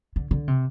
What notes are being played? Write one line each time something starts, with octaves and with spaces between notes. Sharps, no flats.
D3
D3
C3